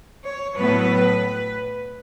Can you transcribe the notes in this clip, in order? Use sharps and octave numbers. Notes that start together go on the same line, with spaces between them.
C#5
A2 F#3 B3 B4